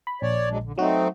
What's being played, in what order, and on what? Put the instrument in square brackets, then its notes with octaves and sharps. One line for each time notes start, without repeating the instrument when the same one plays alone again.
[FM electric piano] B5
[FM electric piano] A#1 [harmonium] C#5 D5
[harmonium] F#3 G#3 D4
D3
[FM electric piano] F#3 F#4 [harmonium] A3 C4 D#4